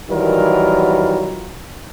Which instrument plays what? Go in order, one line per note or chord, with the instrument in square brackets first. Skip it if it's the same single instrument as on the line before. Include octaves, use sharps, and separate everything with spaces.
[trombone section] D#3 E3 F#3 G3 F4 A#4